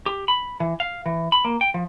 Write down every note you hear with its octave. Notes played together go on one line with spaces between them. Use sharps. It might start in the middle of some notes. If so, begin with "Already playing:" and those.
G4
B5
E3
F5
E3
B5
A#3
G5
F3